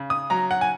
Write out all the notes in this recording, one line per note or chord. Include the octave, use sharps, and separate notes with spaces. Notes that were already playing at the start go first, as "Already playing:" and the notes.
Already playing: C#3
D#6
F#3 A#5
F#5
G#5